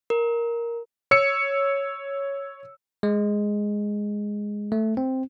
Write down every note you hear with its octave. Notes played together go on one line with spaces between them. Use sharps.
A#4
C#5 E6 C#7
G#3
A3
C4